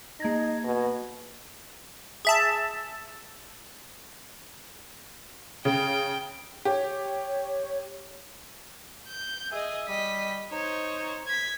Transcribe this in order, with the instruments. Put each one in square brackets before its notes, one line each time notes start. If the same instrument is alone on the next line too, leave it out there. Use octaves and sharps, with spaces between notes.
[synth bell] A#3 G#6 A#6 [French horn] D#4
[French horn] B2
[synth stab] G#4 E5 A5
[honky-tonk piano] C#3 [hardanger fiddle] G5
[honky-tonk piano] G4 [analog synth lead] C#5
[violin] G6
[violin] G#4 D#5 [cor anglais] E5
[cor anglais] G3 [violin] D#5 B6
[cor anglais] D#4 [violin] C5 C#5
[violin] G#6 B6